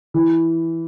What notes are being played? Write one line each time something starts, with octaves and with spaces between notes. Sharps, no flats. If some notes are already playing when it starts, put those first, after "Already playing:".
E3